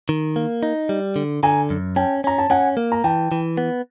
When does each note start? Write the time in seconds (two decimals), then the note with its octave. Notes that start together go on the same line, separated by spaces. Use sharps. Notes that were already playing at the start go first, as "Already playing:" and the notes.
0.09 D#3
0.36 A#3
0.63 D#4
0.89 G3
1.16 D3
1.43 D3 G#5 A#5
1.70 F#2
1.96 C#4 G5 A5
2.24 C#4 A#5
2.38 A5
2.50 C#4 F#5 G#5
2.77 A#3
2.92 A#5
3.04 E3 G5 A5
3.32 E3
3.57 B3